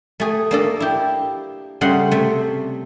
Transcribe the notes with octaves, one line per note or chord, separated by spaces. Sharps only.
A3 G#4
A#3 D4 A4
E4 G4
C#3 G3 A3 F#5 C6
C3 A3